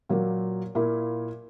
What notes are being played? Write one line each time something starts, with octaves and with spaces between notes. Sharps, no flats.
A#2 F#3 A#3
A#2 A#3 E4